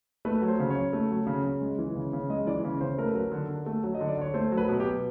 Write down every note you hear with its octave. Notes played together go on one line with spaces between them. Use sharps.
A3 B4
F#3
C5
C#3
C#5
C#3
A3
F#3
C#3
C#3
G#3
E3
C#3
C#3
G#3 D#5
E3 D5
C#3 C#5
C#3 C5
A3 A#4
B4
F#3 A#4
D3
D3
A3
F#3
D#5
D3
D5
D3 C#5
A3 C5
F#3
B4
B2
G4
B2